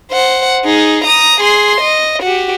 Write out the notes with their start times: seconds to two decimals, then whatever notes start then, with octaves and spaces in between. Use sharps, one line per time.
0.11 C5 F#5
0.65 D#4 G#4
1.04 A#5 D#6
1.40 G#4 C6
1.81 D#5
2.22 F#4 G4